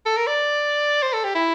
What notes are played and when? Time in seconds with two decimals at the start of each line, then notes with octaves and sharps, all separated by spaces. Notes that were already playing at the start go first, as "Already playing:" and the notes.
0.06 A4
0.17 A#4
0.27 D5
1.03 C5
1.13 A4
1.24 G4
1.35 E4